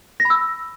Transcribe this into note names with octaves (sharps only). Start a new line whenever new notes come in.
A#6
B5
E6